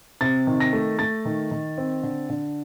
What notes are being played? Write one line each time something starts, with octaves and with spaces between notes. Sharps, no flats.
C3 A6
D#3
A#6
A3
A3 A6
D#3
D#3
C4
D3
D3